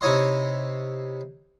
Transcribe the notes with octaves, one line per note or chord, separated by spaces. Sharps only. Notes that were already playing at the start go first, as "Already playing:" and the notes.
C3 D#4 E4 C#5 D#5 C6